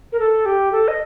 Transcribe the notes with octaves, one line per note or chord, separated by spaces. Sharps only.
A#4
A4
G4
A4
D#5